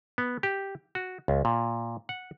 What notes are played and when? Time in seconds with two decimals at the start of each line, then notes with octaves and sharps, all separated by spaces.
0.18 B3
0.43 G4
0.95 F#4
1.28 C#2
1.45 A#2
2.09 F#5